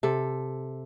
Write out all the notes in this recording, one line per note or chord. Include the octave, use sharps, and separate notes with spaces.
C3 A4